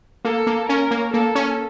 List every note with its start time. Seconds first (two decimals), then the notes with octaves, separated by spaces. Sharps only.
0.25 A#3 A4
0.47 A#3
0.69 C#4 A#4
0.91 A#3
1.14 A#3 A4
1.35 C#4